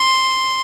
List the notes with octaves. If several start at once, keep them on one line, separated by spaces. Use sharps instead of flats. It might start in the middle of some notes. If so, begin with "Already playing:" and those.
Already playing: C6